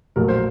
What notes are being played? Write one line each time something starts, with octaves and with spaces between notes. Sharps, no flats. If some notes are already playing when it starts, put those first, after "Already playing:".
A#1 A2 F#3 A3 A#4
C5